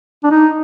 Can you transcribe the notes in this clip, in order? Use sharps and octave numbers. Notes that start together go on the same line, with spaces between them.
D4
D#4